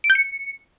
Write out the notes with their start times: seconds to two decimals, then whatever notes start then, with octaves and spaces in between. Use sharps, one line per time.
0.04 D7
0.10 G6
0.15 C#7